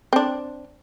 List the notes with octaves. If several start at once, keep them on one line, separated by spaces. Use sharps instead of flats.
C4 D4